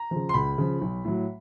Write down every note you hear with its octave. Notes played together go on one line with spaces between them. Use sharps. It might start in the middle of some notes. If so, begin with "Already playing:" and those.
Already playing: A#5
C#3 F3
C6
C#2 B5
C#3 F3
B1
A2 F#3